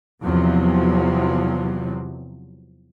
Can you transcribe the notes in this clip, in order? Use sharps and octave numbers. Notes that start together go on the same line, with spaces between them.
E2 C3 F3 F#3